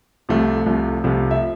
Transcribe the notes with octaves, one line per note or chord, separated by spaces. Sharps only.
C2 C3 F3 A3
C2 C3 F3 A3
C2 C3 F3 A3
E5